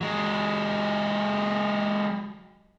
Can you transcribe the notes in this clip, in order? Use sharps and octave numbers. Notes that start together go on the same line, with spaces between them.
F#3 G#3